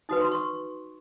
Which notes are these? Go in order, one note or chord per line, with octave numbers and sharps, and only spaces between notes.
D#4 F#4 B4 D#6
C6
C#6